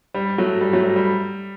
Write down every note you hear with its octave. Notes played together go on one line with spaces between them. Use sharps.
G3
F#3 A3
G3
F#3 A3
G3
G3